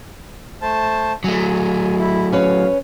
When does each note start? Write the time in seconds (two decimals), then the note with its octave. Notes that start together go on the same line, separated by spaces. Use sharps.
0.62 A3 C5 A5
1.24 F#3 A3 G#5
1.98 E4
2.32 C#4 B4 C#5 F5